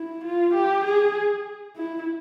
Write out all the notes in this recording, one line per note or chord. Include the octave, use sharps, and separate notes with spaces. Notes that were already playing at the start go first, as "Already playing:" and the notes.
Already playing: E4
F4
G4
G#4
E4